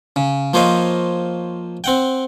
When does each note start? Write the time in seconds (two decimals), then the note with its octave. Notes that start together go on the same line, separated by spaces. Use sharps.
0.16 C#3
0.54 F3 A#3 C5 C#5 D#5 F5
1.84 C4 F#5 G5